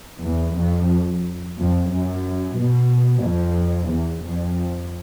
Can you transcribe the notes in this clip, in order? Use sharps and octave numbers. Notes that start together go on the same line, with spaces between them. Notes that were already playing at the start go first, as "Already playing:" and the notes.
E2
F2
F2
F#2
B2
F2
E2
F2